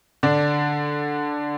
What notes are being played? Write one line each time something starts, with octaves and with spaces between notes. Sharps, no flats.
D3 D4